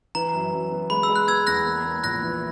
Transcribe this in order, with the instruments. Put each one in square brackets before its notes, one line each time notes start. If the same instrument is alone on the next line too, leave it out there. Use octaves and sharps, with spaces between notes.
[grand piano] E3 [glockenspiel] A#5
[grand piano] F#2
F#2
B3
[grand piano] G#3 [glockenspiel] B5
[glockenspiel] E6
[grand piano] G#3
[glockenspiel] F#6
[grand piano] B3 [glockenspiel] E6 G#6
[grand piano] E2 [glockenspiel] F#6 A#6
[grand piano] A#3
A#3
[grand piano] A#1 [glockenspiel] F#6 A#6
[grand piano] E3